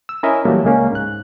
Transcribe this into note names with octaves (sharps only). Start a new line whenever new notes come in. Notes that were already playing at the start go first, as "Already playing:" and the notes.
E6
C#4 E4 A#4 D#5 E5
A#2 E3 F#3 G3 A3 A#3
C#2 G#3 A#3 C#4
G#2 F#6